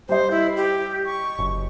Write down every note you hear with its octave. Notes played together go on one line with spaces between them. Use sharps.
G3 C5 D#5
E4
G4
C#6
F#1